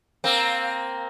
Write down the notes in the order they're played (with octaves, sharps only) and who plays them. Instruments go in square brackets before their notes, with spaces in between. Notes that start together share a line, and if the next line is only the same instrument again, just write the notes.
[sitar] A#3 C4